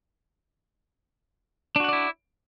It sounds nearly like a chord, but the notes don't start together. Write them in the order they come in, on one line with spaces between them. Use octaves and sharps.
D4 F#4 F#5 D5 E4